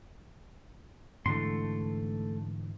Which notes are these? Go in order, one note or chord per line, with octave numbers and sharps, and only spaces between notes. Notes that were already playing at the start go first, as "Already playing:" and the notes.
G#2 D3 E3 A3 C6